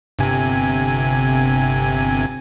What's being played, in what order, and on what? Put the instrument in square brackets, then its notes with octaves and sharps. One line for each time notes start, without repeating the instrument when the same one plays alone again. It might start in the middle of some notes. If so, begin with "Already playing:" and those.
[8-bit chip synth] G1 C3 G#5